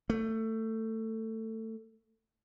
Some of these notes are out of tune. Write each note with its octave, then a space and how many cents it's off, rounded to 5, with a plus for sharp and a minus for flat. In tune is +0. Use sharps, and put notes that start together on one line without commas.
A3 +20